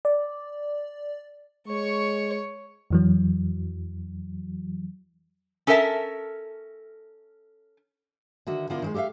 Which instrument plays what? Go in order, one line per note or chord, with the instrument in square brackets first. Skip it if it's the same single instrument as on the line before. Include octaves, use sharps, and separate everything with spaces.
[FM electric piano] D5
[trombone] G#3 [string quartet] C#5 C#6
[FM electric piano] F2 E3 F#3
[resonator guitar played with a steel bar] C#4 A4 A#4 D#5 E5 A5
[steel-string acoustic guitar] D3 D#3 F#4 E5
D3 B3 D4 E4 F4 A#4
D#3 F#3 G#3
G4 A4 D5 E5 F5